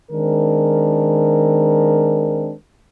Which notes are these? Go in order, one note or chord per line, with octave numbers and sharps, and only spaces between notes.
D#3 G#3 C4 D4 A#4